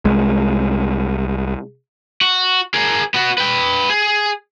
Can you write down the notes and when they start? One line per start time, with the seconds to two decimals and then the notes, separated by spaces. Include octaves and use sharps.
0.05 C2 G#3
2.21 F#4
2.74 G#4 A#4
3.14 B3 F#4
3.38 B4 G5
3.90 G#4